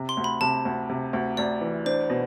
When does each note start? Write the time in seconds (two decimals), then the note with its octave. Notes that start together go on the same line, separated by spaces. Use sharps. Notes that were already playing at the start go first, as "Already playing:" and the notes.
Already playing: C3
0.09 C6
0.17 D2
0.24 B5
0.41 C3 A5
0.65 D2
0.90 C3
1.13 D2
1.37 D2 D5
1.61 E3
1.86 D4 C5
2.10 B2